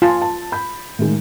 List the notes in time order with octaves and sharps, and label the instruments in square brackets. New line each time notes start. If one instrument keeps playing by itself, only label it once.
[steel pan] F4 [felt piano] G#5 A5 A6
[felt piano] A5
B5 G6
A2 D#3 G#3